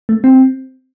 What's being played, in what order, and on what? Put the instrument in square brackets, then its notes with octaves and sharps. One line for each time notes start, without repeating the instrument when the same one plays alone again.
[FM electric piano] A3
C4